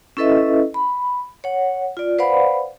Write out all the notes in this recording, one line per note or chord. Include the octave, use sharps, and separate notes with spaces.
C#4 E4 A4 B4 D#5 E5
B5
C#5 F#5
F4 D5
B4 C5 D5 F5 F#5 B5